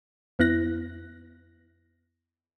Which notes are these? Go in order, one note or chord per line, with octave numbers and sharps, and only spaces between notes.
F2 B3 E4 F#6 A#6